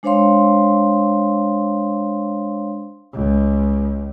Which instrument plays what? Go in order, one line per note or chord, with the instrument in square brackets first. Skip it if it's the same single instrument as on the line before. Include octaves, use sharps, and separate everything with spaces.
[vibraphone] G#3 D4 C5 C#5 F5 C6
[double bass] C#2